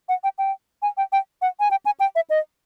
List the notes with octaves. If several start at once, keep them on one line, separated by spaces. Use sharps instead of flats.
F#5
G5
G5
G#5
G5
G5
F#5
G#5
G5
G#5
G5
E5
D#5